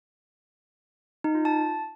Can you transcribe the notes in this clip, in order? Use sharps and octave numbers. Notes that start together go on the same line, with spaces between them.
D#4
F4
A5